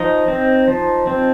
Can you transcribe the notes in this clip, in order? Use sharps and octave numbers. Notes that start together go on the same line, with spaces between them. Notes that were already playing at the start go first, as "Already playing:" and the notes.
Already playing: F3 D#4 D#5
C4
F3
C4